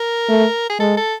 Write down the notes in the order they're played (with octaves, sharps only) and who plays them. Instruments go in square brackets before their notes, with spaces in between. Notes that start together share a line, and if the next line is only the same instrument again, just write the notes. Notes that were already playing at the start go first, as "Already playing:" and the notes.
Already playing: [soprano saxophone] A#4
[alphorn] A3
[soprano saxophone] G#4
[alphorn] G#3 [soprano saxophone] A4
[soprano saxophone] A4